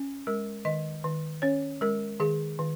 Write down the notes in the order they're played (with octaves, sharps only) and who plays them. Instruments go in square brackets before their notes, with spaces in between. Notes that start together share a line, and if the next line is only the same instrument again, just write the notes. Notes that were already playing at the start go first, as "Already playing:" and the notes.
Already playing: [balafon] C#4
G#3 A#4
D#3 D#5
D#3
C#4 C#5
G#3 A#4
D#3 G#4
D#3